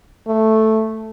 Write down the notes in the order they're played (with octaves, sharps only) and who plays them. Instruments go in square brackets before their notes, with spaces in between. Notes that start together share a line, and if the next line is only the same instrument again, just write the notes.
[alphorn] A3